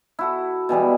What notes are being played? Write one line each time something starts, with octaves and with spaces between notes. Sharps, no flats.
E4 F#4 A4
B2 E3 G3 G#3